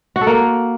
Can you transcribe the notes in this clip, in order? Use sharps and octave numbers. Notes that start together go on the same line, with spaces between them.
F#4
A4
A#3